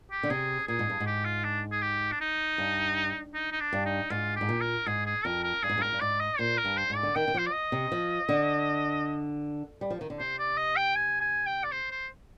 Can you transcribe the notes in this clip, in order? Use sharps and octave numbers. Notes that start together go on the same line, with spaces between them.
G4
D3
C3 G#4
A#2 G#4
G#2
G2
G#2
G4
F4
D4
G#4
G4
D4
D#4
G2
D#4
D#4
D4
G2
D#4
G#2 F4
G4
G#2
A#2
A#4
G#2 G#4
G#4
F2 A#4
A#4
G2 G#4
G#2
G2
G#2 A#4
G2
G#2 D5
D#5
A#2 C5
A#4
G2
C5
G#2
D5
D3
D#3 G5
D#3
F3 C5
D5
D#5
C3
F3
D3
G3
F3
D#3
D3
C3 C5
D5
D#5
G5
G#5
G#5
G5
D5
C5
C5